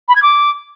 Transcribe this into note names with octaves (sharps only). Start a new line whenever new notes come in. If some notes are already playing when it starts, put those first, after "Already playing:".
B5
G#6
D6